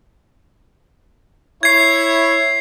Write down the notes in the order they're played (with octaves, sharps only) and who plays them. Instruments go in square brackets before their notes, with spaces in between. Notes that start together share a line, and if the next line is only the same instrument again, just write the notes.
[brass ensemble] E4 C#5 [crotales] G#6 C7